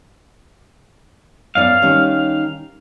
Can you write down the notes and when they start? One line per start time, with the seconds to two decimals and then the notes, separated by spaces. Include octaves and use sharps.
1.55 F#2 B3 D5 F5
1.82 D#3 G3 C#4